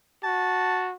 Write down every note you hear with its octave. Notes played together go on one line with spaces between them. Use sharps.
F#4 A5